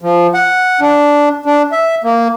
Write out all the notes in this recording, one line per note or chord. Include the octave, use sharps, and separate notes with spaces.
F3
F#5
D4
D4
E5
A#3